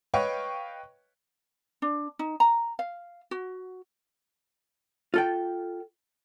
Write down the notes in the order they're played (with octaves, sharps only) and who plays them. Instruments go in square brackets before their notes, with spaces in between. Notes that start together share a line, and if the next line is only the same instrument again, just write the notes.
[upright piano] B4 C#5 D#5 F5 G5 C#6
[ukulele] D4
D#4
A#5
F5
F#4
[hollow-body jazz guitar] F4 A4 G5